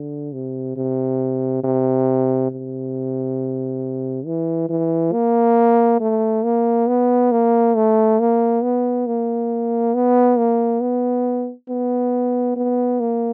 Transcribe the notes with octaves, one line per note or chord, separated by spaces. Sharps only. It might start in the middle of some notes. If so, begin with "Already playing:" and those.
Already playing: D3
C3
C3
C3
C3
E3
E3
A#3
A3
A#3
B3
A#3
A3
A#3
B3
A#3
B3
A#3
B3
B3
B3
A#3